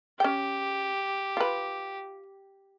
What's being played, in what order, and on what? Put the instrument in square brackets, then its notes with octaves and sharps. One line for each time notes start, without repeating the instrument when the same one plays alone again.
[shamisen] C#4 G5 [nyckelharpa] G4
[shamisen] F4 B4